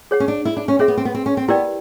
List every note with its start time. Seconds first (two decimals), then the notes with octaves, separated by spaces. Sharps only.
0.11 G#4 C#5 F#5
0.20 C#4
0.28 D4
0.45 E4
0.57 D4
0.68 C#4
0.79 C4 G#4 C#5 E5
0.88 B3
0.97 C4
1.05 B3
1.14 C4
1.26 C#4
1.37 C4
1.48 B3 E4 G4 A#4 D5 G5